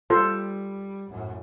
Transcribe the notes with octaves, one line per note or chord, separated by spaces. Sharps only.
G3 F4 A4 C5
F#2 A2